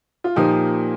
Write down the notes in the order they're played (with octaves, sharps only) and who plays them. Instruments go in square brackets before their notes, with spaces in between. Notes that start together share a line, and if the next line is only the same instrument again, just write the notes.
[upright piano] F4
A#2 F3 A#3 D#4 G4